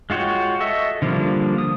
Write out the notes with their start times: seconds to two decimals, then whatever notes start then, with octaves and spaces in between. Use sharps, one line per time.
0.10 G#3 F4 F#4 C#5 G5
0.60 A4 D#5 E5 C#6
1.02 D3 F3 G3 A#3 D4
1.58 D#6